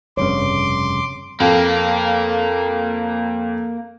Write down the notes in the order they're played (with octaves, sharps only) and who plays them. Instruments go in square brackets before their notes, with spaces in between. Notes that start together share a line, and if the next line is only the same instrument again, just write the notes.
[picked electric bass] F1 G2 C#3 [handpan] C4 C#5 [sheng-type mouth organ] C6 D6
[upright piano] F2 [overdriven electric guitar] A#3